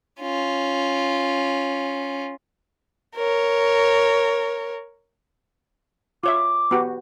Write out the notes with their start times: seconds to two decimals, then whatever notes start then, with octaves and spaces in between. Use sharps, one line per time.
0.21 C#4 F4
3.16 A#4 C#5
6.24 F4 C#5 E5 D6
6.71 B3 F#4 G4